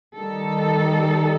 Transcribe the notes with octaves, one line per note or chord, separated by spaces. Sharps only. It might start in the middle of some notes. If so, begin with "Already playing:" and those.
D#3 G3 D#4 A4